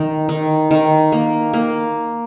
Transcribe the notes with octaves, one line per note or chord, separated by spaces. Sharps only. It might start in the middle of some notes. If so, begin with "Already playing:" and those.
Already playing: D#3
D#3
D#3
A#3
A#3